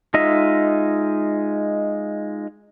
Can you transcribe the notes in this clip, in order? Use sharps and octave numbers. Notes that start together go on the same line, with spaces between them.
G#3 D#4 F4 D#5 E5